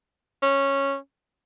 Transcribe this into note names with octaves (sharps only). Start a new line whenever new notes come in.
C#4